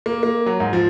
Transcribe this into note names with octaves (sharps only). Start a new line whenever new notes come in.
A#3
A#3
F#3
G#2
F3